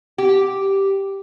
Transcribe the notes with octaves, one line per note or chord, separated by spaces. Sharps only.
G4